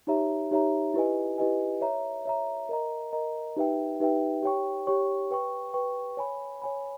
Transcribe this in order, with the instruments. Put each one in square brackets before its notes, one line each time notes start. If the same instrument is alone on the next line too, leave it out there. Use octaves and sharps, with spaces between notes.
[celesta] D#4 G4 C#5 E5 A#5
D#4 G4 C#5 E5 A#5
E4 G4 B4 D#5 G#5
E4 G4 B4 D#5 G#5
C#5 E5 A#5
C#5 E5 A#5
A#4 D#5 A#5
A#4 D#5 A#5
D#4 G4 B4 E5 G5
D#4 G4 B4 E5 G5
G4 C#5 G5 C#6
G4 C#5 G5 C#6
B4 G5 C#6
B4 G5 C#6
C#5 G#5 B5
C#5 G#5 B5